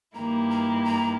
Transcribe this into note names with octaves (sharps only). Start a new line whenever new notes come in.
G2 D#3 A#3 E4 G4 A#5
A#5
A#5